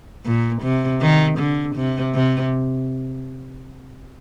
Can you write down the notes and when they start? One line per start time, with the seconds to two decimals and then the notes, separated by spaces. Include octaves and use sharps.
0.25 A#2
0.63 C3
1.01 D#3
1.39 D3
1.76 C3
2.15 C3